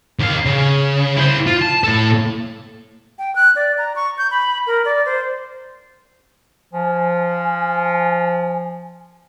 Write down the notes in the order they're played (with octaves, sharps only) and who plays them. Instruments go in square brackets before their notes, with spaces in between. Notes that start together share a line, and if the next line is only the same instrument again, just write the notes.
[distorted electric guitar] D#2 F5
C#3
E4 C5
F4
A5
A2 A4
[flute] G5
F#6
D5
A#5
C#6
G6
B5
A#4
D5
C5
[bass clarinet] F3 [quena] G#5